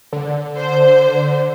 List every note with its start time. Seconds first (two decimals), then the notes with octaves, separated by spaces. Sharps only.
0.13 D3
0.57 C5